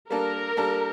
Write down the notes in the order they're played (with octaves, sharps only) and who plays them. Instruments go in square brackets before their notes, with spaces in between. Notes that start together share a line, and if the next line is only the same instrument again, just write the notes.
[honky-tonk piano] G3 A#3 D4 A4 [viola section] A#4
[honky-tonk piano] G3 A#3 D4 A4